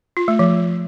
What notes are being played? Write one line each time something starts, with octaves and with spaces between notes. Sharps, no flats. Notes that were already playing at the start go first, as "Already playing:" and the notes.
F4
A3
F3